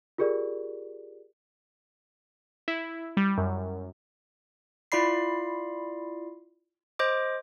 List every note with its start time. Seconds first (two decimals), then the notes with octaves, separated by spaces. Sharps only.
0.18 F4 G4 G#4 A#4 D5
2.68 E4
3.17 G3
3.38 F#2
4.92 E4 F4 D5 B5 C7
6.99 C5 D#5 D6